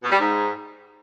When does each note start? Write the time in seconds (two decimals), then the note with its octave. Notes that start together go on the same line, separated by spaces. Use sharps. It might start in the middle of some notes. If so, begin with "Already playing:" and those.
0.02 B2
0.11 G3
0.19 G#2